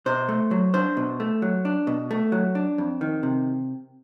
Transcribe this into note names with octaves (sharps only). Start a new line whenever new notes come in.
B2 C5
A3
F#3
D4 C5
B2
A3
F#3
D4
B2
A3
F#3
D4
F2
D#3
C3